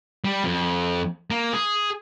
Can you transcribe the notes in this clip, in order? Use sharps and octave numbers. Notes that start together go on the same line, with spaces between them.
G3
F2
A#3
G#4